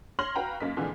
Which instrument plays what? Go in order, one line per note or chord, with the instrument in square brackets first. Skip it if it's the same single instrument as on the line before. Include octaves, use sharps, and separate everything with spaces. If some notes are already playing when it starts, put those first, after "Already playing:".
[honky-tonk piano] C#5 C6 F6 A#6 F#7
F#4 B4 F5 G5 A#5
F#2 A#3 D#4 B6
F2 A#2 D3 E3 G#3